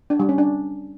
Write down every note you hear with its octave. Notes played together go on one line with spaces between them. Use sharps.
D4
G3
C#4
D4